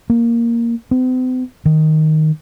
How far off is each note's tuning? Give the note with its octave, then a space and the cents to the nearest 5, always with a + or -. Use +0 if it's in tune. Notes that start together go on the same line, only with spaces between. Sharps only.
A#3 +0
C4 -45
D#3 +0